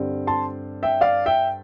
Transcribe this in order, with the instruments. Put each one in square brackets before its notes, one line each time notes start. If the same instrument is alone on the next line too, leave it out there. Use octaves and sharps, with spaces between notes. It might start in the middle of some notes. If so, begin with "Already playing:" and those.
Already playing: [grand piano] G2 D3 G3 C4
[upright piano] A5 C6
E5 G5
D5 F5
E5 G5